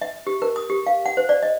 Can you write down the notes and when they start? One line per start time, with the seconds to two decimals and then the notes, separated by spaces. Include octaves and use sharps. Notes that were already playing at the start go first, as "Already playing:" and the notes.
0.02 E5
0.27 G4
0.42 A#4
0.56 D#6
0.70 G4
0.87 F5
1.06 F#5
1.17 C5
1.29 D5
1.43 D#5